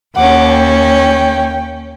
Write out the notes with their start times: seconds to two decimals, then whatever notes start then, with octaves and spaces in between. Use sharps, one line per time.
0.16 D#2 C#4 F#5 D6
0.52 G5